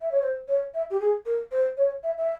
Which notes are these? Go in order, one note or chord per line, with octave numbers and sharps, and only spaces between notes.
E5
C#5
C5
C#5
E5
G4
G#4
A#4
C5
C#5
E5
E5